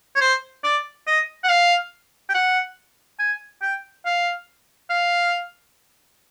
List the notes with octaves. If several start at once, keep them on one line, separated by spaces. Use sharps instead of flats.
C#5
C5
D5
D#5
F#5
F5
G5
F#5
G#5
G5
F5
F5